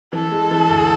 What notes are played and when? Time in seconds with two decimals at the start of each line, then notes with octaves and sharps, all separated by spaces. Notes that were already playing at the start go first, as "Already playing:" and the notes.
0.13 E3 A4
0.31 G#3
0.51 E3
0.70 D2